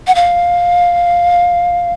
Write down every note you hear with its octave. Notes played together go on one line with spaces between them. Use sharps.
F#5
F5